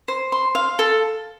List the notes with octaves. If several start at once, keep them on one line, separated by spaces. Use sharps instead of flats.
C5
C6
F5
A4